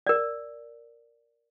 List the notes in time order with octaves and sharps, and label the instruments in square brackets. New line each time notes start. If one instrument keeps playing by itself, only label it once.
[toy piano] A#4 D5